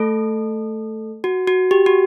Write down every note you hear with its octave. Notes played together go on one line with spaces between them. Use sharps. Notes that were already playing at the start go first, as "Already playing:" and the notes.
Already playing: A3 A4
F#4
F#4
G4
F#4